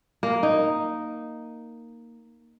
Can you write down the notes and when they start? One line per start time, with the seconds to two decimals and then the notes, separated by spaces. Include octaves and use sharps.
0.23 A#3
0.43 D#4